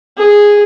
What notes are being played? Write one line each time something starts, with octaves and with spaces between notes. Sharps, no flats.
G#4